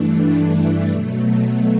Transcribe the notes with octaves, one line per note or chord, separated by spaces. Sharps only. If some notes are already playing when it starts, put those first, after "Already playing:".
Already playing: G2 E3 A3 D4
B2 F#3 A3